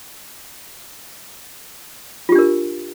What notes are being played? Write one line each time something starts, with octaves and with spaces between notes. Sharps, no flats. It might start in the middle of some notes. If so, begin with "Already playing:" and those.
D4 F4 G4 A#4